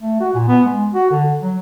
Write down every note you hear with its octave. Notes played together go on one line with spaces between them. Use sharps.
A3
F#4
A#2
B3
G#3
F#4
D3
F#3